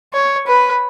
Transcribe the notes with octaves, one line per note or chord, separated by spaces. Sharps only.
C#5
B4